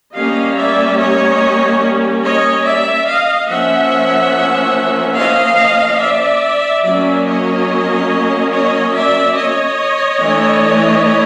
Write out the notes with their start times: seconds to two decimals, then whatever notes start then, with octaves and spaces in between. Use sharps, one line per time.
0.14 G3 A#3 C#4 D#5 F5
0.56 D5 E5
0.98 C#5 D#5
2.23 C#5 D#5
2.66 D5 E5
3.08 D#5 F5
3.49 F3 A#3 C#4 E5 F#5
5.17 D#5 F5
6.01 D5 E5
6.84 F#3 A#3 C#4 D5 E5
7.26 C#5 D#5
8.52 C#5 D#5
8.94 D5 E5
9.36 C#5 D#5
10.19 E3 A3 D4